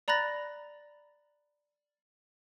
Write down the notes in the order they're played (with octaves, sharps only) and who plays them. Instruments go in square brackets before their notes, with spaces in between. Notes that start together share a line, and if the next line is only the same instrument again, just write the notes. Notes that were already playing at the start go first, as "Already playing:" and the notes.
[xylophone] D5 A#5 B5 F#6 A6 A#6